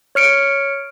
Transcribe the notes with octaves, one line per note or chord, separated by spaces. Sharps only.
C#5 F6 C#7 D7